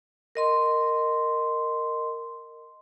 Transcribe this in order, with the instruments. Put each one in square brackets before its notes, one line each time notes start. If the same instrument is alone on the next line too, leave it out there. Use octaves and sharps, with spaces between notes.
[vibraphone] A#4 D#5 C6